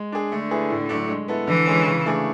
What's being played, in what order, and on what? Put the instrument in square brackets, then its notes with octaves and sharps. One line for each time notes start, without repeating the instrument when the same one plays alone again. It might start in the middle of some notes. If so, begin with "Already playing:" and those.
Already playing: [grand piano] G#3
D4 G#4
[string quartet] D3 [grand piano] A3
[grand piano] E4 G#4 B4
A2
F#3 A3 D4
G#3
B3 E4 A4
[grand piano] D3 [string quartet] E3
[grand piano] G#3 C#4 G#4
C#3
E3 A3 D4 G#4